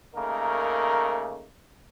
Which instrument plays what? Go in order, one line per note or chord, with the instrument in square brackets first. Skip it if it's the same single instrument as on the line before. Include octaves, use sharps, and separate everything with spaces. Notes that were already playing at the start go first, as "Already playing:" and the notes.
[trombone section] C#3 A3 A#3 D#4 A#4